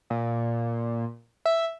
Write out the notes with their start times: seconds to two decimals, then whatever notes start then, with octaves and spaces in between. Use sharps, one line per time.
0.10 A#2
1.45 E5